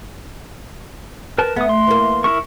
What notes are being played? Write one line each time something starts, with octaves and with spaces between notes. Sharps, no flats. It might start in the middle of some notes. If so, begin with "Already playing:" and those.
A#4 B4 A5
A3 B3 D#6
C6
E3 A#3
E4 A#4 C#6